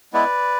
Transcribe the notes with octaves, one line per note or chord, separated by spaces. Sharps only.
G#3 B3 E4 B4 D5